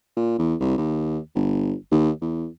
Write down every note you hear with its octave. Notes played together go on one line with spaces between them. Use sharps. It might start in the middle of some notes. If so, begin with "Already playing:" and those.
A#2
E2
C2
D#2
G1
D#2
E2